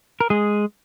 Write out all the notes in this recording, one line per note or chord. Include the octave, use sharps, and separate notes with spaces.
A#4
G#3 G#4